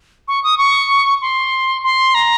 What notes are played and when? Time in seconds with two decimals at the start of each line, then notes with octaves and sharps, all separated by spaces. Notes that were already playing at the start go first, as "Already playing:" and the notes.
0.28 C#6
0.44 D#6
0.58 C#6
1.21 C6
1.83 C6
2.14 A#5